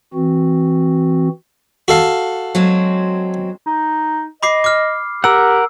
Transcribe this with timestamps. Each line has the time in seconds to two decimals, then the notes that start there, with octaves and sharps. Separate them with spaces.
0.14 E3 C4 F#4
1.88 F#4 A4 F5
2.55 F#3 G#3 C4
3.66 D#4
4.43 D#5 B5 D6 C7
4.64 D6 F6
5.24 G4 A#4 F#5 E6